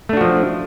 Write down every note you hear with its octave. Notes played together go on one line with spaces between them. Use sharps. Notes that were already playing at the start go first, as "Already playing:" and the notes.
F3 A3 D4 F#4